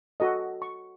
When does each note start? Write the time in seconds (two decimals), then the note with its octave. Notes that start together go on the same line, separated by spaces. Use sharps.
0.20 F#4 A4 D#5
0.62 C#6